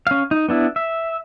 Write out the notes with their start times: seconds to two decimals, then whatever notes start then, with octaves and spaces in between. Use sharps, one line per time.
0.07 C#4 F5
0.31 D#4
0.49 B3 D4 E4
0.76 E5